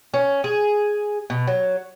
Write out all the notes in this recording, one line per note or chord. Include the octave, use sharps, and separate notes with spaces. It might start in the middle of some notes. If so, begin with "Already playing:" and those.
C#4
G#4
B2
F#3